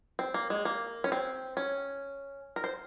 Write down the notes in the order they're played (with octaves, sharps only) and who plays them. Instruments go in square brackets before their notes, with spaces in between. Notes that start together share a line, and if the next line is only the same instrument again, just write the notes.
[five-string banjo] C4
A#3
G#3
A#3
C#4
C4
C#4
A#4
C5